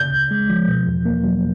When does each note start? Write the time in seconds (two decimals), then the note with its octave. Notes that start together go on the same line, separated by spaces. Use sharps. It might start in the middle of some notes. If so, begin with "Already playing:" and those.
Already playing: C#3 G6
0.12 C#2
0.31 G#3
0.50 F3
0.67 B2
0.87 E2
1.05 A#3
1.24 F#3